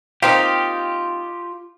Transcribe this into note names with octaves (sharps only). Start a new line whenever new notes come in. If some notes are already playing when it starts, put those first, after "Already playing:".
A#3 C4 D#4 F4 G4